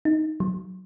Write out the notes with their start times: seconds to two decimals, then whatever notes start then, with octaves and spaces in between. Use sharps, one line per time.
0.05 D#4
0.40 F#3